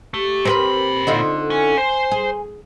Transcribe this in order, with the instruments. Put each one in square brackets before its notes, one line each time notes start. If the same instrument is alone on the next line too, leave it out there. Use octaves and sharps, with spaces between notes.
[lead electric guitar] A3 [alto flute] G4
[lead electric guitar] A#2 B5 [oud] C4 A#4 B4
[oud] D3 D#4 F4
[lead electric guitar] C#4 [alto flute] G#5
[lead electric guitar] C5
[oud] G#4